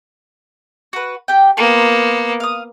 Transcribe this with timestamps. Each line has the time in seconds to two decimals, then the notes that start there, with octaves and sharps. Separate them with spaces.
0.93 F#4 B4
1.28 G4 G5
1.57 A#3 B3 F4 A#4
2.40 F5 D#6